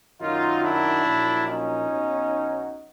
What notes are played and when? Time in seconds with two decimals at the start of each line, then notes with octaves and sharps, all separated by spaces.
0.21 F#2 D#3 F#3 D#4 F4
0.64 D4 E4
1.06 A#1 A#2 F#3
1.47 C#4 D#4
1.89 B1 B2 F#3